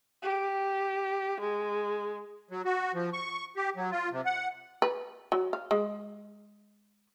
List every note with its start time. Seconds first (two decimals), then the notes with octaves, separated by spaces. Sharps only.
0.23 G4
1.40 G#3
2.51 F#3
2.65 F#4
2.94 F3
3.13 C#6
3.56 G4
3.76 F#3
3.91 F4
4.11 C3
4.25 F#5
4.82 B4
5.32 F#3
5.53 F5
5.71 G#3